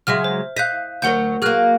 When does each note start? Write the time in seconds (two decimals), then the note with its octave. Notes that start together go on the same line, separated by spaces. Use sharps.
0.07 C#3 F#3 G#3 E5 F6
0.24 C5
0.56 D#5 F5 F#6 G6 B6
1.02 D2 F#3 A#4 C#5 F#5 G6
1.42 F#3 A#3 G#4 F6 F#6